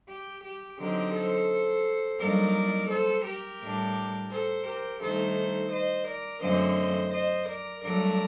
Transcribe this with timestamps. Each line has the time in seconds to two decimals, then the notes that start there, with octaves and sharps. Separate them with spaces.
0.09 G4
0.44 G4
0.79 D3 F#3 C4 D#4 G4 A#4
1.14 A4 C5
2.20 G2 F#3 A#3 D#4 A#4 D5
2.90 A4 C5
3.25 G4 A#4
3.60 A2 G3 D4
4.31 A4 C5
4.66 G4 A#4
5.01 G2 D#3 A3 D#4 A4 C5
5.72 C5 D#5
6.06 A#4 D5
6.41 F#2 D3 A3 C4 C5 D#5
7.12 C5 D#5
7.47 A#4 D5
7.82 G2 F#3 A3 A#4 D5